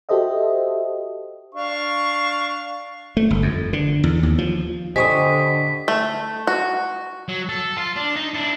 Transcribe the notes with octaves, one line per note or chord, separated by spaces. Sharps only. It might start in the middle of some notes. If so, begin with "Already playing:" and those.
F#4 G4 A4 C5 D#5 E5
D4 F5 C#6
A3
G1
F2
D3
E2
D#2
F3
D3 G4 C5 D#5 G#5 C#6 D#6 B6
A3
F#4
F#3
A4
F4
D4
D#4
D4 E4